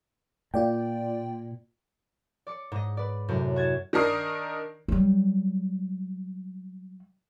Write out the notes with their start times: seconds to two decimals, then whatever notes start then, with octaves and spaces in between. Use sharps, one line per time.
0.54 A#2 F4 D5 G5
2.47 D5 D6 C#7
2.72 G#2 D#5
2.97 B4 D5
3.28 F#2 A2 C3
3.56 F#4 G#6 A6 E7
3.93 D#3 D4 A#4 D#6 C7
4.88 F#3 G3